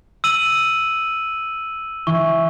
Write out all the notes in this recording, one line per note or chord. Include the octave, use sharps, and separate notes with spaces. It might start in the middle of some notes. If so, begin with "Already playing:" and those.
E6 D#7 F#7
E3 C#6